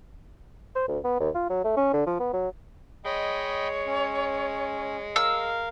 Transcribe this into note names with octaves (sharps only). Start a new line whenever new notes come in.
C5
D2
B3
D#2
F4
F#3
A3
C#4
D3
F3
B3
F#3
G#3 C#5 D#5 G5 B5
C#4
A#4 F5 E6